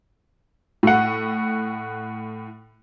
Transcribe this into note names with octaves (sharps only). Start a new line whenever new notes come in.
A2 F#5